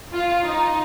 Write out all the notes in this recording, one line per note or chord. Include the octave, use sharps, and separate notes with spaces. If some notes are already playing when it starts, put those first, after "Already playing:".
F4
D#4